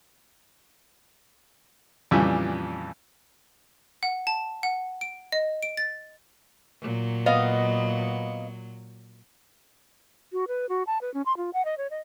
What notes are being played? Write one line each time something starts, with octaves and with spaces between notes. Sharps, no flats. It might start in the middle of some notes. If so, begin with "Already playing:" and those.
F2 A#2 C#3 E3 G3
F#5
A5
F#5
D7
D#5
D7
A6
A#2 F#3
B3 D#5 F5
F#4
B4
F#4
A5
B4
C#4
C6
F4
F#5
D#5
C#5
D#5